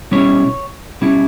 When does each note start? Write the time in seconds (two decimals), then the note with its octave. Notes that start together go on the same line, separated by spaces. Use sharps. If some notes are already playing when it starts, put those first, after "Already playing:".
0.11 B2 G3 C#4 E4 C#5
1.01 B2 G3 C#4 E4